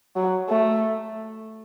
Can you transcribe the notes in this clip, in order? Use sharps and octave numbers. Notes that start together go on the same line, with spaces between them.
F#3
A3